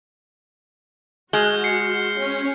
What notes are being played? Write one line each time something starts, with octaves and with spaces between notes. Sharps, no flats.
G#3 F#4 F6 G6 G7
C7 C#7
C#4